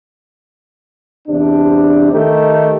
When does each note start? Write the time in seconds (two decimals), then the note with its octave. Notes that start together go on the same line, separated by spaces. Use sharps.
1.28 E2 C3 D4
2.12 D#3 A3 D#4 G4